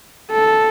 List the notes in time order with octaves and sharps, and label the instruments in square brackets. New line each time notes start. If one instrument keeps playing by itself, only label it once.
[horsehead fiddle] A4